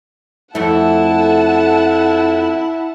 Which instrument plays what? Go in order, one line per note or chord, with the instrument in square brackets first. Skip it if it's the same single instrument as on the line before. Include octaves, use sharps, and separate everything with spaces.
[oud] F2 A3 [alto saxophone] E4 [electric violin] F#5 A5